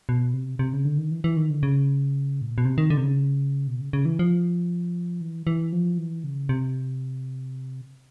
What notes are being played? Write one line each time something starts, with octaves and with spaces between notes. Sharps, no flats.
B2
C3
C3
C#3
D3
D#3
E3
E3
D#3
D3
C#3
A2
A#2
B2
C3
D#3
D3
C3
C#3
B2
C#3
C#3
E3
F3
E3
E3
F3
E3
C#3
C3